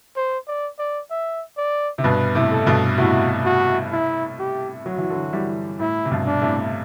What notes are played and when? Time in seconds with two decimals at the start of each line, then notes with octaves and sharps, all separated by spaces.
0.17 C5
0.47 D5
0.79 D5
1.11 E5
1.57 D5
1.98 C3
2.04 G2 B2 B4
2.35 A2 C3
2.51 A4
2.66 G2 B2
2.98 A2 C3 F#4
3.45 F#4
3.92 E4
4.39 G4
4.85 F#3 F#4
4.98 E3
5.10 D3 F#3
5.33 E3 G3
5.79 A2 E4
6.05 C3
6.11 G2 B2
6.26 D4
6.42 A2 C3